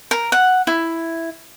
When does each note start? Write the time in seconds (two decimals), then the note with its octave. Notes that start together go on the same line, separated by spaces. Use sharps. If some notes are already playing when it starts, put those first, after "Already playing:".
0.11 A#4
0.32 F#5
0.67 E4